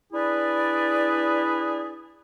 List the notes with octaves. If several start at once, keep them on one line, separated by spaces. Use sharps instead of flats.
D4 E4 G#4 B4 D5